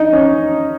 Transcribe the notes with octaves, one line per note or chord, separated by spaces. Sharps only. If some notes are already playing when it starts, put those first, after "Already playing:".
Already playing: D#4
C#4